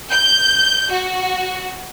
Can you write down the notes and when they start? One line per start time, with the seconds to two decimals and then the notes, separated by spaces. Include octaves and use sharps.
0.11 G6
0.91 F#4